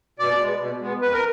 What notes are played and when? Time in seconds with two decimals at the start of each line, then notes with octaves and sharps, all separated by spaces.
0.19 B2 D5
0.39 G#3
0.44 B3
0.60 B2
0.81 G#3 B3
1.01 F2 B4
1.13 A#4